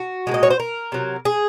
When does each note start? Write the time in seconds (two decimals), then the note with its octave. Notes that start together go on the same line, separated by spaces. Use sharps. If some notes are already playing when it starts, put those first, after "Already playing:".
Already playing: F#4
0.27 F3 G#3
0.31 A#2 D#5
0.43 C#5
0.51 C5
0.60 A#4
0.92 C3 F#3
1.25 G#4